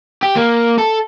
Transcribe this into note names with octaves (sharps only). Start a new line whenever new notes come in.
G4
A#3
A4